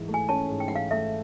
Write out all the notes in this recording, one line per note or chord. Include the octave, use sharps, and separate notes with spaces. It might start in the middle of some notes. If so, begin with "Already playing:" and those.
Already playing: G#2 E3
A3
G#5
C#4 A5
G#2
G5
E3 F#5
F5
A3 E5